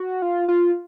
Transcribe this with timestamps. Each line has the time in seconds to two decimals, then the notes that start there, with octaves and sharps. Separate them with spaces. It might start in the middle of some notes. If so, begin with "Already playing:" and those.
Already playing: F#4
0.22 F4
0.48 F4